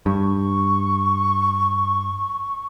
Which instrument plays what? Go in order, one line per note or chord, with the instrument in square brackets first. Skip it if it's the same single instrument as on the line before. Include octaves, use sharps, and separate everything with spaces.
[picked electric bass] G2 [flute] C#6